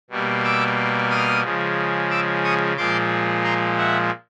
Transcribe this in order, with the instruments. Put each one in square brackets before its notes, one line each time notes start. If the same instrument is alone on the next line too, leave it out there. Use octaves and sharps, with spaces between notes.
[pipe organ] B2 G3 A#3
D6 E6
D#6 F6
C#3 F3 G#3
D6 E6
C#6 D#6
A#2 F3 G#3 C6 D6
A#5 C6
E5 F#5